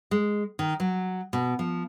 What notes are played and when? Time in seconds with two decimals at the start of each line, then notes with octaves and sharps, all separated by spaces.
0.11 G#3
0.59 D#3
0.80 F#3
1.33 B2
1.59 F3